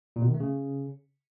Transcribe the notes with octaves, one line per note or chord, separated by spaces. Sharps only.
A#2
B2
D#3
A3
C#3